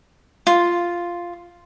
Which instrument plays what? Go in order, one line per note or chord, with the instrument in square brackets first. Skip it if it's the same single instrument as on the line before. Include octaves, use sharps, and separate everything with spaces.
[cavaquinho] F4